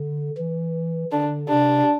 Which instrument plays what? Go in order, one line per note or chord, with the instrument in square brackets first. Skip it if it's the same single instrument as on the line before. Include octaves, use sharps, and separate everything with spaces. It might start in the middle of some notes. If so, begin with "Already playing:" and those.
Already playing: [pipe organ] D3
E3
[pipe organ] D3 [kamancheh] D4
[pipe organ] C3 [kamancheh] D4